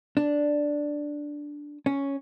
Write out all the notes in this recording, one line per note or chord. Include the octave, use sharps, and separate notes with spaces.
D4
C#4